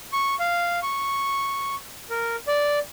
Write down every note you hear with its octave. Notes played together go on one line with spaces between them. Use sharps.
C#6
F5
C#6
A#4
D5